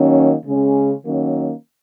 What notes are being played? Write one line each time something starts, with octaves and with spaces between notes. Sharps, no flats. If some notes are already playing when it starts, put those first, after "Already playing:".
Already playing: D#3 F#3 A#3 C#4
C#3 G#3 C#4
D#3 F#3 A#3 C#4